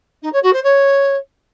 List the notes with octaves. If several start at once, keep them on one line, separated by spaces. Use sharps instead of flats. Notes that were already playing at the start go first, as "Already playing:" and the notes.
D#4
C#5
F#4
C5
C#5